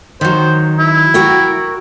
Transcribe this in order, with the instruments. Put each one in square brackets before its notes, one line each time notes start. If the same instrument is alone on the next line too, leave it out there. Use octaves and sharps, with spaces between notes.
[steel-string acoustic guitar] D#3 F#3 [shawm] C5
[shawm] E4
[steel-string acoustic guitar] F#4 A#4 G5